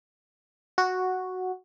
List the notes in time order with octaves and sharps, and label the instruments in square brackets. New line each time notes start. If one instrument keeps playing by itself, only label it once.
[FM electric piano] F#4